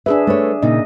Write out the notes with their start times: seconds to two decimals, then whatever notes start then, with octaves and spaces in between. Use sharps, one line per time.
0.06 D4 G#4 B4 E5
0.27 A3 B4 C#5
0.62 A#2 C#3 D#4 D#5